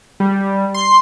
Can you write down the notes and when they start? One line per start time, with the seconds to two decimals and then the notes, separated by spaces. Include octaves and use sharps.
0.20 G3
0.74 C6